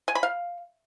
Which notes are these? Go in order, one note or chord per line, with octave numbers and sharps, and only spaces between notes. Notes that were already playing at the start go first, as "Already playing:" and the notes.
G#5
B5
F5